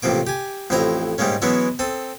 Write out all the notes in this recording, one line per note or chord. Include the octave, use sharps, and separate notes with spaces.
A1 C3 F3 A#3 D6
G4 G#5
A1 F2 E4 C5 D#5 A#5
G#2 G3 G#3 A#3 C#4
E3 F#3 G#3 B3 C#4 E4
C4 A4 D#6